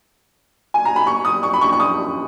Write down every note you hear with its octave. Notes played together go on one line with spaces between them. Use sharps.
G#5
A#5
B5
C#6
D#6
C#6
B5
C#6
C#6
D#6